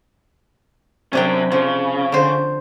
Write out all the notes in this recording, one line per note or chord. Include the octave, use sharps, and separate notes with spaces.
C3 F#3 C#4 D4 G5
C#3 F3
D3 C5